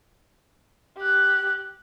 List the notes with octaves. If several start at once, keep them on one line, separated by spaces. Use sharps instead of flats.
G4 F#6